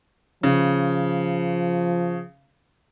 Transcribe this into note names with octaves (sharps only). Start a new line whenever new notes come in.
C#3 F3